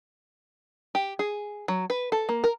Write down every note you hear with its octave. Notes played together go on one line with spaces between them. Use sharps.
G4
G#4
F#3
B4
A4
A#3
A#4